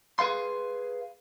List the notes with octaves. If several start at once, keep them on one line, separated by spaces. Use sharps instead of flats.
G#4 B4 F5 C6